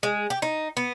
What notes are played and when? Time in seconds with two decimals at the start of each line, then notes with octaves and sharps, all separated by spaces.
0.03 G#3
0.30 G4
0.42 D#4
0.77 B3